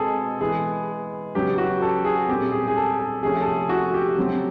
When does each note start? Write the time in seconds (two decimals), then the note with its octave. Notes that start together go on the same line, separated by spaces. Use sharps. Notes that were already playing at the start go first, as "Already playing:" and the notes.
Already playing: B2 G#3 C4 G#4 A4
0.40 E3 G#3 B3 G#4
1.34 C#3 F#3 B3 G4
1.58 F#4
1.82 A4
2.05 G#4
2.28 A#2 G3 C4 G4
2.52 G#4
2.68 G#4
2.76 A4
2.99 A4
3.23 C3 F3 A3 C#4 G#4
3.41 A4
3.46 G#4
3.69 F#4
3.94 G4
4.17 C#3 F#3 A3 C4